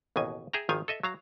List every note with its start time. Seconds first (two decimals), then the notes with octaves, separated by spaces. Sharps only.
0.16 A1 D#2 B2 G#5
0.53 G#4 E5 G5 A#5
0.69 G#1 D#3 F3 F5 G#5
0.88 A4 D#5 E5
1.03 F#3 F5 A#5